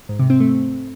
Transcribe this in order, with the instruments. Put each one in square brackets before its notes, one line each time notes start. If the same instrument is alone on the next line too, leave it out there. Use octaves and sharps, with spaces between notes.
[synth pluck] G#2
C3
C4
A3